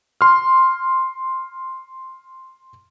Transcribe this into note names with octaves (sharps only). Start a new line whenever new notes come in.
C6 F6